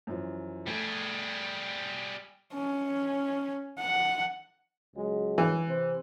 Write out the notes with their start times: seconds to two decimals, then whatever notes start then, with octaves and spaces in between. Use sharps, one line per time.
0.07 F#2 E3 F3
0.67 G3 A3 G#4
2.53 C#4
3.79 F#5
4.95 C#2 F#3 G#3
5.38 E3
5.67 C3 C5